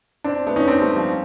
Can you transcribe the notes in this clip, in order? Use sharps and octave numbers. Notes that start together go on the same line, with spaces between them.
C4 D4
A3 B3
C#4 D#4
C4 D4
G3 A3
F3 G3